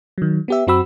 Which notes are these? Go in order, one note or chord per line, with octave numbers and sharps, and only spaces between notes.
D#3 F#3
B3 G4 E5
F#2 C4 F#4 B5 E6